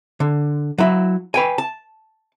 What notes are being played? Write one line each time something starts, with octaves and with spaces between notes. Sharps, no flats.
D3
F#3 E4
B4 G5 G#5
A5